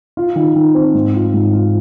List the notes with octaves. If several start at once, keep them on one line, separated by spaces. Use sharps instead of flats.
F4
D#3
D#3
C4
G#2
F4
G#2
F4